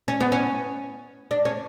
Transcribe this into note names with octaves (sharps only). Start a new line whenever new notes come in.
C#4
B3
C#4
D4
C#4